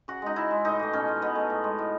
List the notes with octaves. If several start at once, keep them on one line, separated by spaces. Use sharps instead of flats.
C#3 F#4
G#3 D#4
C#3 E4
G#3
A2 D#4
E3 A3
B2 C#4
G#3
B2 B3
F#3 A3
A2
G#3
A2